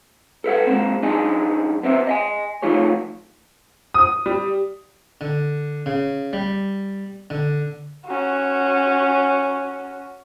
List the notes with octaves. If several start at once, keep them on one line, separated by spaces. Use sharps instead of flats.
A4 B4 E5 F#5
G#3 A#3 C4
F#2 D4 D#4 G#4
B3 C4 E5
D#5 F5 G#5
F3 A3 D#4 F4 G#4 C#5
D#6
G3
D3
C#3
G3
D3
C#4 F#4